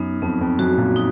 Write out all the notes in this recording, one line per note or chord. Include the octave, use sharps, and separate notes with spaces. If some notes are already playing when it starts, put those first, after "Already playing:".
Already playing: F#2 B3 D#4
F2 B3
F2
F#2 F#4
A#2
D#4